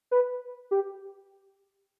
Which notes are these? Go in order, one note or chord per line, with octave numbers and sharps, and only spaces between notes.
B4
G4